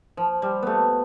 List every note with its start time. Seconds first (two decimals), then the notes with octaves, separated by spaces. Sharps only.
0.17 F3
0.42 G3
0.63 A3 B3